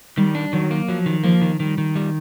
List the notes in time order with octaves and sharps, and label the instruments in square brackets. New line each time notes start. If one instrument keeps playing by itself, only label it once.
[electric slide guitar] D#3 [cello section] G3
[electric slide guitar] D4
[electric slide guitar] D#3 [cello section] F#3
[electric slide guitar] A#3
[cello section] F3 [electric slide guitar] F#3
[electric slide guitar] D#3
[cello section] F3 [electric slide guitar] A#3
[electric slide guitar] D#3
[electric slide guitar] D#3 [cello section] G3
[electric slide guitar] D#3
G3